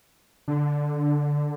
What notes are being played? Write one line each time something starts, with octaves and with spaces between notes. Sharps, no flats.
D3